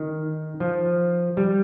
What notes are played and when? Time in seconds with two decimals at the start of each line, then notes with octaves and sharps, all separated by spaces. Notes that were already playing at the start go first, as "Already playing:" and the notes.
Already playing: D#3
0.60 F3
1.37 G3